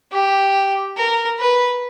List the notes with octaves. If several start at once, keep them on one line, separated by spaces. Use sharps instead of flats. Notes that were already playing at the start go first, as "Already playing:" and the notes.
G4
A#4
B4